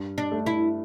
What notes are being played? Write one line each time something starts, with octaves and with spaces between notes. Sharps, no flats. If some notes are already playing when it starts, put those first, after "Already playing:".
Already playing: G2
D4
A3
E4